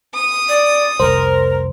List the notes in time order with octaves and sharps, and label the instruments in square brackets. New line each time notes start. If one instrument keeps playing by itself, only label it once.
[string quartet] D#6
[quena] D5
[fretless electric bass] F1 C2 [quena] A#4 [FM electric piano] C5